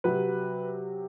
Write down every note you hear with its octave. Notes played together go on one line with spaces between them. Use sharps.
C3 F#3 B4